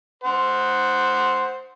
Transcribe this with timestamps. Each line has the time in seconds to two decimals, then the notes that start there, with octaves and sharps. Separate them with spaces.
0.24 C5 F#5